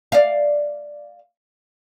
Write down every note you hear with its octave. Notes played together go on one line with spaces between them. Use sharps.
D5 F5